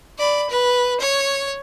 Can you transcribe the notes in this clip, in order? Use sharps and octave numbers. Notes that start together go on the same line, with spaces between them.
D5 B5
B4
C#5